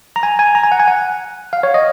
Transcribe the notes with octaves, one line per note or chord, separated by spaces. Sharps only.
A#5
G#5
G#5
A#5
G#5
F#5
G#5
F#5
F5
C#5
D#5